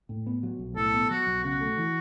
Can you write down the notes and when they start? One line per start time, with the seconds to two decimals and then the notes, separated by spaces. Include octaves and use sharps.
0.09 A2
0.26 B3
0.43 F#3
0.59 B1
0.76 A2 A4
0.93 B3
1.10 F#3 F#4
1.27 B1
1.43 C#3 F#4
1.61 A3
1.78 E3